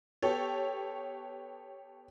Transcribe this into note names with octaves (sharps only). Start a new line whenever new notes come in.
B3 G4 A4 C#5